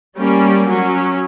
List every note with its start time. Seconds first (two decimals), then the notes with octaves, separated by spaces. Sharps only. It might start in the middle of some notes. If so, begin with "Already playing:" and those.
0.16 G3 A#3 C#4
0.67 F#3 C#4